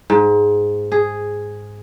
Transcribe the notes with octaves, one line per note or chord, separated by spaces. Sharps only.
G#2
G#4